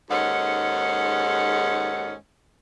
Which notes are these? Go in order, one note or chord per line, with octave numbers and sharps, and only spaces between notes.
D#2 G#2 G#3 C#4 A4 F#5